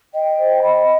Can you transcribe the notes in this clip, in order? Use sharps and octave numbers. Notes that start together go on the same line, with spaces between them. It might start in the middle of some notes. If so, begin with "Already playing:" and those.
D#5 G5
C5
B5